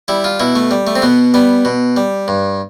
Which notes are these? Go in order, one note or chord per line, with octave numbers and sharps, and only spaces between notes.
G3 E4
F4
B2 E4
A3
G3
A3
C4
B2 B3
G3 B3
B2
G3
G2